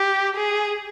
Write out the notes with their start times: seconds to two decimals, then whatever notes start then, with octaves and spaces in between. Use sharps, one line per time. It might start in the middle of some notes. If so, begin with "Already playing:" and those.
Already playing: G4
0.36 G#4